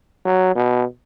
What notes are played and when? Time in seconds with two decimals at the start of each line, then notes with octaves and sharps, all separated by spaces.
0.25 F#3
0.56 B2